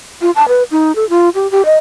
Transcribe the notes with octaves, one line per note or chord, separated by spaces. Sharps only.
F4
A5
B4
D#4
A4
F4
G4
G4
D#5